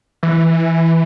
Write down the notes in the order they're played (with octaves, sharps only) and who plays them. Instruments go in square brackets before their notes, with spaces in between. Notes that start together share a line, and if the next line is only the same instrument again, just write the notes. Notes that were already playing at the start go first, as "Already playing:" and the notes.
[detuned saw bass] E3